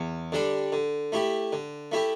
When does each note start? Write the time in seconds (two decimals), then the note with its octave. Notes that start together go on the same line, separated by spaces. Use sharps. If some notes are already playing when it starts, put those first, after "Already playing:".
Already playing: E2
0.32 D3 G3 D4 A4
0.72 D3
1.12 A3 E4 G4
1.53 D3
1.92 A3 E4 G4